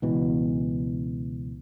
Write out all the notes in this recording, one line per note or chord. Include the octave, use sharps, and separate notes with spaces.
C#2 B2 E3